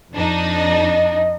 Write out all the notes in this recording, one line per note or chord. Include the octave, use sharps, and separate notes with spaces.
F2 D4 D#4
D#5